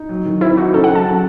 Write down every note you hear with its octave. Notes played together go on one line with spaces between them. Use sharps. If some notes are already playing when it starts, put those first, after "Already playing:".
Already playing: D#4
F#3
D#3
C4 E4
D#4 F#4
C#3 A4
F#5
F#3 A5
C#3